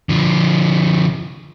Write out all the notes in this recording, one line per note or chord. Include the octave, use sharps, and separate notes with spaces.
D3 F3